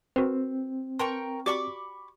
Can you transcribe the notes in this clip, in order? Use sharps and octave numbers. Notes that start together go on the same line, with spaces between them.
C4 F#4 A#4 B4
A#4 B4 G5 A5 C6 C#6
F#4 G4 D5 B5 C#6 D6